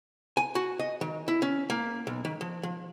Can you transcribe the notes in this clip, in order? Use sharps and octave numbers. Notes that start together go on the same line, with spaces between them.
G#5
F#4
D#5
D#3
E4
C#4
A#3
B1
D#3
F3
F3